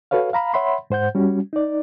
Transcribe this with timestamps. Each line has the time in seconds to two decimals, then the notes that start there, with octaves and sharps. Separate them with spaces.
0.11 F#4 A4 B4 C#5 F5
0.33 F5 A#5 B5
0.54 C#5 E5 F#5 B5 C6
0.90 G#2 C5 F#5 G6
1.15 G3 C#4 F#4
1.53 D#4 D5